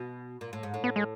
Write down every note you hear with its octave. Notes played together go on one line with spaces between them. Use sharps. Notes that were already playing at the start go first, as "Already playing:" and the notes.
Already playing: B2
A#2
A2
G#2
A2
B3
G#3